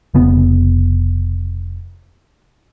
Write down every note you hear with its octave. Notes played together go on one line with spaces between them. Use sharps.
F1 C#3 B3